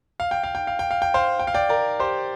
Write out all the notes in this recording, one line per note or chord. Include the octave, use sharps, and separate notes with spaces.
F5
G5
F5
G5
F5
G5
F5
G5
C5 F5
G5
F5
D5 G5
A#4 D5
G4 C5